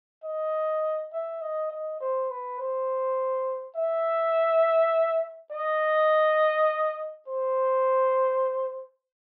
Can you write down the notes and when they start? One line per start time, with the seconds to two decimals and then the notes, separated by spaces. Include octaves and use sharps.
0.24 D#5
1.13 E5
1.41 D#5
1.71 D#5
2.00 C5
2.30 B4
2.60 C5
3.76 E5
5.52 D#5
7.28 C5